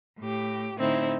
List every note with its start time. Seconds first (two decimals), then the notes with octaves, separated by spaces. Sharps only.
0.19 A2 G4
0.78 A2 D3 C4 D#4 E4